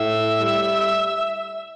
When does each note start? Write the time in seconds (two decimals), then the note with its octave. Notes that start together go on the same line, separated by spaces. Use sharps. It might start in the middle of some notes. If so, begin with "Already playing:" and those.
Already playing: A2 E5
0.37 G3